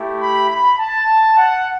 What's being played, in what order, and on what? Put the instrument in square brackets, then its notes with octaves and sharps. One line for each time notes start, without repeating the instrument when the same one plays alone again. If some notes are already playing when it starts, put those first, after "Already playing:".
Already playing: [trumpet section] A3 E4 G4
B5
B5
A5
F#5